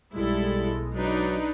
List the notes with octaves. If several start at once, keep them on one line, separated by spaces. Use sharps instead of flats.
B1 G3 G#3 E4 A4
F#3 D4 D#4 B4